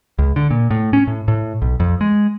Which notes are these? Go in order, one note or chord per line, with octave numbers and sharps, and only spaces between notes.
C#2
D3
A#2
A2
C#4
A2
A2
B1
F2
G#3